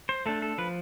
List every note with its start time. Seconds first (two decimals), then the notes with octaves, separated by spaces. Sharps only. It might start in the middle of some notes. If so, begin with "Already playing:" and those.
0.09 C5
0.26 A3 D4 A4
0.42 A4
0.58 F3 B4